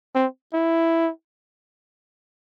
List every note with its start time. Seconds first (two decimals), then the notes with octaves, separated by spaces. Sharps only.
0.15 C4
0.53 E4